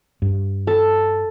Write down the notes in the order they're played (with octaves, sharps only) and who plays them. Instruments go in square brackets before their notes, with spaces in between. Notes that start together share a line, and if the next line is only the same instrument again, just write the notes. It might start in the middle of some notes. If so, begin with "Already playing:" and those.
[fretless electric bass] G2
[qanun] A4